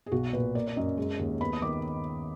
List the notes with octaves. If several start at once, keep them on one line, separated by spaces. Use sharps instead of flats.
G#4
B1 F#4
A#2 B4
A#3 D5
D5
F#2 D#5
G#3
D#2
B3 B5
D#6
D#3 D6